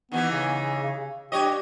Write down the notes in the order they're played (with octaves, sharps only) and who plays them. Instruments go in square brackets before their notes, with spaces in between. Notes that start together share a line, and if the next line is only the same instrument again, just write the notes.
[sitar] D#3 E3 G4 [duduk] B3
[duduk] C#3
[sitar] G2 C#5 D#5 [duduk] G4